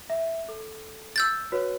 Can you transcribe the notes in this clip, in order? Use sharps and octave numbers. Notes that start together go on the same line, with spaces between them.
E5
A4
E6 G6 A6
F#4 B4 C#5